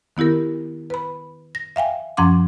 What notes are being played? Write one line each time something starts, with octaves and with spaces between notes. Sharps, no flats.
D#3 B3 E4 G4 A#4
B4 B5
A#6
E5 F5 G5 G#5
F#2 F3 C#4 F#5 C6 D6